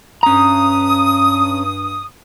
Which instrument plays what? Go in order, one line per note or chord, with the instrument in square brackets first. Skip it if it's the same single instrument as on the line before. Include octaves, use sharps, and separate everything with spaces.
[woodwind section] G2 D#6 [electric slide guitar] C#4 A#5